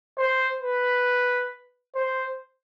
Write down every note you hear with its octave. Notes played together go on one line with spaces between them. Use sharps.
C5
B4
C5